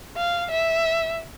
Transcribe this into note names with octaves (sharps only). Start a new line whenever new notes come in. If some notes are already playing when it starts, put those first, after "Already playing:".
F5
E5